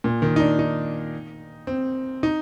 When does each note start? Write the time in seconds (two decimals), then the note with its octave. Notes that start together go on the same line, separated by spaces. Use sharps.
0.04 A#2
0.22 D#3
0.36 D#4
0.40 D4
0.59 D#4
1.67 C4
2.23 D#4